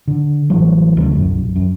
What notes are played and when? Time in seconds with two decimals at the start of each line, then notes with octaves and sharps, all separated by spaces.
0.08 D3
0.50 A1 E3 F#3 G3
0.97 D2 C#3
1.15 B1 F#2
1.56 F#2